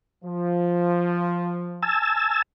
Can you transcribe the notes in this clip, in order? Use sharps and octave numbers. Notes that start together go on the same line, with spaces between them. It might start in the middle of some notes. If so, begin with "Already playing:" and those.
F3
G#5 A5 E6